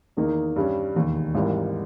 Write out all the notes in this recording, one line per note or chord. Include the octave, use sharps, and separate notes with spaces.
E2 D#3 A#3 D#4
G2 G3 C#4
E1 D#2 D#3
G#1 G#2 E3 G3 A#3